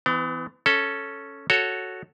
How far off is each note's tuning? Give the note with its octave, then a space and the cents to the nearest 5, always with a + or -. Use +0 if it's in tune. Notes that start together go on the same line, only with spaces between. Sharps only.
E3 +0 B3 +40
C#4 +0 A4 +0
F#4 +0 A4 +0 C#5 +0